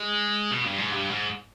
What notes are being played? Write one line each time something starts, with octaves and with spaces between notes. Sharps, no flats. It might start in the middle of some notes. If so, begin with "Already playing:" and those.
Already playing: G#3
B2
G2
G#2
G2
G#2